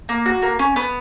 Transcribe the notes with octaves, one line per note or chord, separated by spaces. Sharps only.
A#3
F#4
A#3
C#4
B3